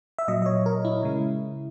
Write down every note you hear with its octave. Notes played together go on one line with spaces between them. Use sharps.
E5
A#2 F#3 D#5
D#5
C#5
A#4
E4
C#3 G#3